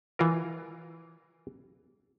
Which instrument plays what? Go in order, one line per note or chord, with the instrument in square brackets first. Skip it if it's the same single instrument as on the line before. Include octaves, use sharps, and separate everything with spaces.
[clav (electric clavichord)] E3 F4 A#4